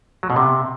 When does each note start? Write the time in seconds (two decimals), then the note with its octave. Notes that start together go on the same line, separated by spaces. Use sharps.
0.23 F#3
0.30 B2
0.36 C3